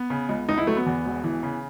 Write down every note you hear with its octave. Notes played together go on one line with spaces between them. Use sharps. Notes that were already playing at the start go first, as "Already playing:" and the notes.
Already playing: B3
C#3
C#2
C#2 D#4
E4
F#3 A3
B3
E2
E1
E3
C#3